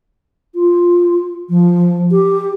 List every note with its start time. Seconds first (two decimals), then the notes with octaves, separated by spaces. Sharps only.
0.55 F4
1.49 F3
2.11 G4